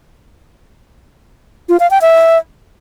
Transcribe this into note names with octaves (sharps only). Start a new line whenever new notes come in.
F4
F5
G5
E5